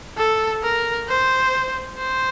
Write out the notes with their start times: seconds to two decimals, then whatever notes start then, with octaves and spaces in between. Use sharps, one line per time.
0.18 A4
0.63 A#4
1.08 C5
1.98 C5